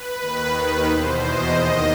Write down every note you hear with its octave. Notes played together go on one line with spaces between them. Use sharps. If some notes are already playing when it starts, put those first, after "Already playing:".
Already playing: B4
D#2 D#3
B4
E2 B2 C5
D#5
D#2 D#3